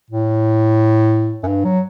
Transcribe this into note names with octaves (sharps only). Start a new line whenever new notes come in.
A2
F#2
G2
F#3